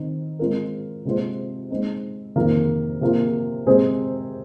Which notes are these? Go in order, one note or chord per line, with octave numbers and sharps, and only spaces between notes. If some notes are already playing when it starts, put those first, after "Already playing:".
Already playing: D#3 C4 D#4
G#3 C4 F4 A#4
C3 G#3 C4 F4 C5
G#3 C4 D#4
F2 C3 D#3 A#3
C3 F3 A#3 F4
C3 G#3 C4 G#4 C5